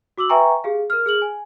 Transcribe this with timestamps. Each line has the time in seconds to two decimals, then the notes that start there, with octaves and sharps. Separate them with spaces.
0.18 F#4 D6 E6 F#7
0.29 B4 E5 G5 G#5 A#5 C#6
0.64 G4 G#4 F5
0.90 A#4 F6
1.06 G#4 F6 F#7
1.22 G#5